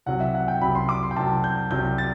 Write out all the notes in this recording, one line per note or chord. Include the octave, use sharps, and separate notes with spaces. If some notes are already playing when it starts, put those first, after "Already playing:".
C2 C3 F#3 F#5
E5
F#5
G5
C2 C3 F#3 B5
C6
D6
C6
G5
C2 C3 F#3 A5
G6
C2 C3 F#3 G6
A6